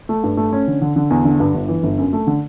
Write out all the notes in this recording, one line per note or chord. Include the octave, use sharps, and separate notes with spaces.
A3
G2
A3
C#4
D3
D3
D3
E2
D3
G2
G1
E3
G1
F#2
A3
D3